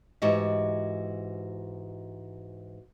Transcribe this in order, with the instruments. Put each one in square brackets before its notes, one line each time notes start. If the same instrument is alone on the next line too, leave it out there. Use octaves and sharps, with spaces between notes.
[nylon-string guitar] G#2 E3 F#4 G4 D#5 E5